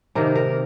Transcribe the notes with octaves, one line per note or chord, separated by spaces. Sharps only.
C3 D#3 A#3 A#4
A#4